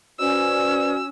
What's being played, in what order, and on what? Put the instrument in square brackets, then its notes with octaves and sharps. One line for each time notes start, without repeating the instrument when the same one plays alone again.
[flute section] C#4 [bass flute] F#4 [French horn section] B4 C5 D5 [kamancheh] E6